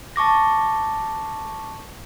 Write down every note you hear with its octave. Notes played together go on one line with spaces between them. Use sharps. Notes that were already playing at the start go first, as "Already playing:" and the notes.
A5 C#6 D6 A#6